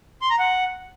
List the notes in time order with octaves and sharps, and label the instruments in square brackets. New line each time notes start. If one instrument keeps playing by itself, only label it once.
[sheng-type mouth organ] C6
A#5
F#5